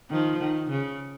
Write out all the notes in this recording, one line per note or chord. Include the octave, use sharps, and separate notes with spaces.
D#3 F3
D#3
C#3